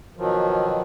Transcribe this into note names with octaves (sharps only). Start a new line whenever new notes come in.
B2 D#3 F3 F#3